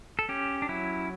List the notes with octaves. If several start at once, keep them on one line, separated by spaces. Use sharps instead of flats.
A4
C#4 G4
D4
F#3 E4